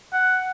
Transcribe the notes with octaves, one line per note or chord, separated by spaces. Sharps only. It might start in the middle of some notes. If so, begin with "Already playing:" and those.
F#5